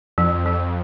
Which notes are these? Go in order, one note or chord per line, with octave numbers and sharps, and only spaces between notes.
F2 F3
F3